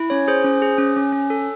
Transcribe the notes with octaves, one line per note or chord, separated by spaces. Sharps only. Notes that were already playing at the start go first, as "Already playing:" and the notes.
Already playing: E4
C#4 C#5
G#4 C5
C#4
G#4
C#4
C#4
C#4
A4